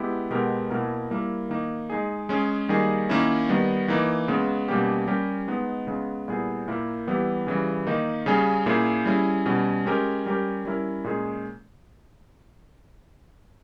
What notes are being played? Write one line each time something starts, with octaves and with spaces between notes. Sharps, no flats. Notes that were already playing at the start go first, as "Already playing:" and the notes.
Already playing: G#3 B3 E4 G4
B2 G#3 B3 G4 A#4
B2 A#3 E4 A#4
G3 A#3 E4 A#4
D#3 A#3 D#4
G#3 D#4 G#4
G#3 C#4 G#4
D#3 G3 A#3 D#4 G#4
D#3 A#3 C#4 E4
D#3 G3 B3
E3 A#3 D#4
C#3 G#3 B3
B2 G3 A#3 C#4 G4
G3 C#4 G4 A#4
G#3 B3 D#4
C#3 G#3 B3
A#2 G3 B3 E4 G#4
A#2 A#3 E4 A#4
E3 G3 B3 E4 G4
C#3 E3 G3
D#3 A#3 D#4
C#3 G3 C#4 G#4
A#2 A#3 C#4 E4 G#4
G3 C#4 E4 G#4
B2 G3 C#4
G#3 C#4 G4 A#4
G3 C#4 G4 A#4
G3 C#4 E4 A#4
A#2 G#3 C#4 G#4